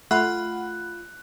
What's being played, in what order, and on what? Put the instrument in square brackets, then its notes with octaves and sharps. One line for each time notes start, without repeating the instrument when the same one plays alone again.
[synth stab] A3 [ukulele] F4 [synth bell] F#5 B5 [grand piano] F#6